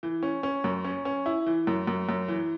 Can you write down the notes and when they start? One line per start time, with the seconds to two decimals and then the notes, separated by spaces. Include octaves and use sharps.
0.03 E3
0.23 C#4
0.43 C#4
0.64 F#2
0.84 C#4
1.05 C#4
1.26 E4
1.46 E3
1.67 F#2
1.87 F#2
2.09 F#2
2.28 E3